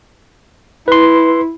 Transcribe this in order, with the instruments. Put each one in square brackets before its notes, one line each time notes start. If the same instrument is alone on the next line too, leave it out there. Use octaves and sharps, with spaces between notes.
[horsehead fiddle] E4 [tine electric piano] B4 C6